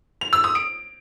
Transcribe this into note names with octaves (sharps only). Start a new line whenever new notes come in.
F7
E6
D#6
D7